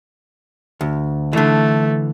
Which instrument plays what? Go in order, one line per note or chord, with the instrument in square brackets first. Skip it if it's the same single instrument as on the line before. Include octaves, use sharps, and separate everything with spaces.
[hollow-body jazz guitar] D2
[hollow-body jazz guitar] D3 E3 [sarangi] A3